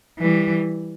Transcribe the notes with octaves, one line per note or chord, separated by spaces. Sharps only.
E3 G3